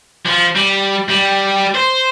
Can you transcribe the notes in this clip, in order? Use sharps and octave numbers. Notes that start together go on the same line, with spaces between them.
F3
G3
G3
C5